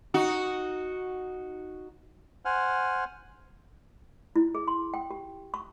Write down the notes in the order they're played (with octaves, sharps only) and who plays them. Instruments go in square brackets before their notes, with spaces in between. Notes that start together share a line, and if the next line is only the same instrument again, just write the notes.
[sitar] D#4 F#4
[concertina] C5 F#5 G#5 F6
[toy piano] E4
G#4
C6
G5
G4
C#6